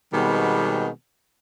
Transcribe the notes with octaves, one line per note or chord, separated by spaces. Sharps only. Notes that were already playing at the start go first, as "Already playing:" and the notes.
B2 D#3 G3 G#3 B3 C4